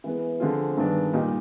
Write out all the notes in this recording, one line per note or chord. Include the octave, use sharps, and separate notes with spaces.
E3 G#3 B3
D3 F3 G#3 C4 F4
G2 D#3 G#3 B3 D4
A#2 G3 A#3 D#4 G4